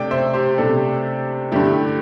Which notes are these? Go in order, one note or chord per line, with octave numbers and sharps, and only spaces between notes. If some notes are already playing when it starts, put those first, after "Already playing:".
Already playing: C3 A3 D4 D5 G5
C5 E5
G4 C5
C3 A3 D4 A4
G2 D3 A3 E4 G4